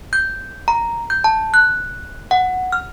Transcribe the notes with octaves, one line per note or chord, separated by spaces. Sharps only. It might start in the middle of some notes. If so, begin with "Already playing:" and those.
G6
A#5
G6
A5
F#6
F#5
F6